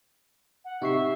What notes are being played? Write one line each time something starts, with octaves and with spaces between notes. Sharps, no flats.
F#5
C3 D#4 E5 C#6 C7